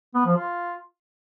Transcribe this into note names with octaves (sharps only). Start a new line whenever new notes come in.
B3
F3
F4